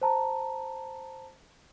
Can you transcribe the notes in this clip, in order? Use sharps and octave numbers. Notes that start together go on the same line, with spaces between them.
C5 A5 A#5